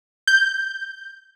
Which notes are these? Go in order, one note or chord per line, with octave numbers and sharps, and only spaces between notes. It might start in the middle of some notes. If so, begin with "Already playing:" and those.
G6